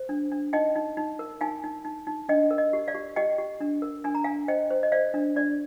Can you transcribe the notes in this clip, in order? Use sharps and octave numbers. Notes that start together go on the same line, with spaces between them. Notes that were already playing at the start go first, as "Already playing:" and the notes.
Already playing: C5
D4
D4
D#4 D#5 G5
D#4
D#4
A#4
D#4 F5 G#5
D#4
D#4
D#4
D4 D#5 G5
A#4
D#5
G4
D5 F5
G4
G4 D#5 G5
G4
D4
A#4
D4 G#5
A#5
D4 F5 G#5
C5 D#5 G5
C5
D#5
C5 D5 F5
D4
D4 D5